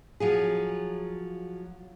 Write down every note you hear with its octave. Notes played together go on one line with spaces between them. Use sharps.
F3 F#3 G#4